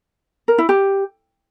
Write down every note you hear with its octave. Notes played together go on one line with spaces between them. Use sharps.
A#4
E4
G4